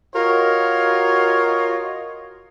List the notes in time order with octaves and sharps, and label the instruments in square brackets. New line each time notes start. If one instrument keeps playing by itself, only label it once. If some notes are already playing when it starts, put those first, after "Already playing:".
[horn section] F4 F#4 A#4 C#5 D#5